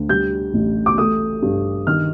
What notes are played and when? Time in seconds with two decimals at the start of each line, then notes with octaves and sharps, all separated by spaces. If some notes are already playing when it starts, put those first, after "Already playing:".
Already playing: D2
0.09 G3 G6
0.54 A1
0.86 D6
0.98 A3 D#6
1.42 G2
1.87 D#3 F6